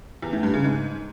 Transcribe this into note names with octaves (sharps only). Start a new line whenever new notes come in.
E2
A2
G2
C#3
G#2